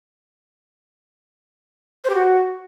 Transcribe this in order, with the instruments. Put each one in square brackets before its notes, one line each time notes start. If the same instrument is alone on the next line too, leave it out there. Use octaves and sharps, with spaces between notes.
[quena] C5
G4
F#4